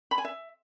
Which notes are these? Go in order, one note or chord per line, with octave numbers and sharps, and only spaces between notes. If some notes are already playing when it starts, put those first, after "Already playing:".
B5
G#5
E5